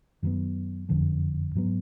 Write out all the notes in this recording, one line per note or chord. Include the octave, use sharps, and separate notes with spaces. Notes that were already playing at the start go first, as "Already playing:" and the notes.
F#2 D#3 F#3 B3
F#1 F2 D3 F3
G#2 F#3 B3